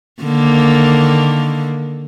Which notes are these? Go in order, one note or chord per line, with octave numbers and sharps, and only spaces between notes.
D3 D#3 A#3